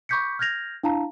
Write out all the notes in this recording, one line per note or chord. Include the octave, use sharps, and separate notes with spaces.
B5 C#6 D6 G6 B6 C#7
F6 G6 G#6 A#6 F7
D4 E4 F5 A5 A#5